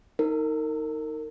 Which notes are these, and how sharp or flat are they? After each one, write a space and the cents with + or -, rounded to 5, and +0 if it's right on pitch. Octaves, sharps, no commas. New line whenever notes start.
D#4 +15 A#4 -30